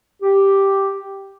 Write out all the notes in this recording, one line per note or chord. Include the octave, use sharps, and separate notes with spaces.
G4